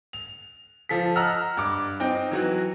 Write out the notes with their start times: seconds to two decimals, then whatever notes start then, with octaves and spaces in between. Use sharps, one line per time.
0.13 F7
0.89 F3 A4 B6
1.16 D#5 F#5 A#5 E6 F6
1.57 G2 D6
2.00 C4 D#4 G5
2.31 E3 F#3 F#4